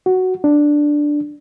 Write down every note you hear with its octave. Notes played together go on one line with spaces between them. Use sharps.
F#4
D4